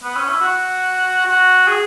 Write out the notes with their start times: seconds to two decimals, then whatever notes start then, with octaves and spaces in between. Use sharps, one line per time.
0.03 B3
0.16 C#4
0.28 E4
0.41 F#4
1.26 F#4
1.67 G#4